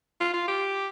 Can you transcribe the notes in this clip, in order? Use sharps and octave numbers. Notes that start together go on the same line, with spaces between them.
F4
F4
G4